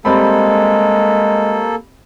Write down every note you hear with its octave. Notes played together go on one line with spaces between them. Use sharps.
G3 G#3 A#3 C4 A4 B5